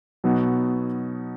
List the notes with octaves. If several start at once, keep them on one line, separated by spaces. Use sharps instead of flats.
B2 F#3 B3 D#4 F#4